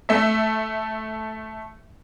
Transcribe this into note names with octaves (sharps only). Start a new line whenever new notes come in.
A3 E5